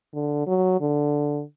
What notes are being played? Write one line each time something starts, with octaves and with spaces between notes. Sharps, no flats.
D3
F#3
D3